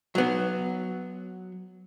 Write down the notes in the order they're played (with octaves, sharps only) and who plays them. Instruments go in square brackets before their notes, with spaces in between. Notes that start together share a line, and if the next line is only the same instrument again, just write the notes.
[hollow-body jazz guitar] F#3 B3